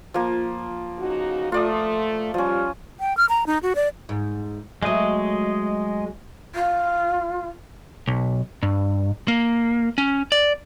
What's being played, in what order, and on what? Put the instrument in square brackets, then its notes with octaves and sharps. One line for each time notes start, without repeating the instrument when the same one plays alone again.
[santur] F3 A#3
[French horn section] C#3 D#4 F#4
[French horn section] A3 [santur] F4 D5 D#6
[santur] F3 C#4 [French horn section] G3
[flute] G5
F6
A#5
D#4
F#4
D5
[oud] G#2
[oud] F#3 A3 [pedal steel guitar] G#3 D#5
[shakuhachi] F4
[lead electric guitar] B1
G2
A#3
C#4
D5